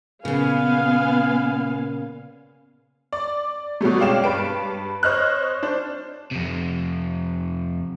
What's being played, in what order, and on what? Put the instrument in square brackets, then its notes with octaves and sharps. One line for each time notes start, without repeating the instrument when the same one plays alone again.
[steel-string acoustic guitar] A#2 C#3 [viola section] B3 F5 G#5
[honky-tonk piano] D5
B2 F#3 G3 A3
G#3 C#4 D5 F5 G5 E7
G2 B4 D7
C5 C#5 D#5 F6 F#6
D4 C5
[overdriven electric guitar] F2 C3